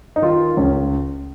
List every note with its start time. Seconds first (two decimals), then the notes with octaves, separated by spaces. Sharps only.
0.16 D#4
0.22 D#3 F4
0.57 C#2 C#4